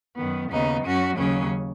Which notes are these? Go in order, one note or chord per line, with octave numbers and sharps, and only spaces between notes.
F#2 D#3 B3
D#2 C#3 B3 D#4
F#2 F#3 C#4 F#4
D#2 C#3 F#3 C#4